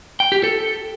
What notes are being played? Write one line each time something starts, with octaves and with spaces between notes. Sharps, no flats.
G5
G4
A4